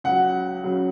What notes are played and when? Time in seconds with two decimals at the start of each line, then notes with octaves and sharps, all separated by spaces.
0.04 C#2 C#3 F#3 F#5
0.64 C#3 F#3